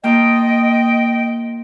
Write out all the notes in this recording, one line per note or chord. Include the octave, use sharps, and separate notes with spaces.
A#3 F4 D#5 G5 A5